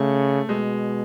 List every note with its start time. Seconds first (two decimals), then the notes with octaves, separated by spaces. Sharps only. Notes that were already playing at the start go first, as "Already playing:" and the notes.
Already playing: C#3 A3
0.49 B2 G#3